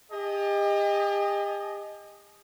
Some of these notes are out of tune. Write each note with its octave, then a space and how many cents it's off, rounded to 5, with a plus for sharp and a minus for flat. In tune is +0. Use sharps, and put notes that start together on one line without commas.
G4 +40 D#5 +0 G#5 +45